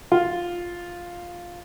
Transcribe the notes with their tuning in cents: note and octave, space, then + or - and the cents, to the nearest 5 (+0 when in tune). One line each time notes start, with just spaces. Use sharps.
F4 +5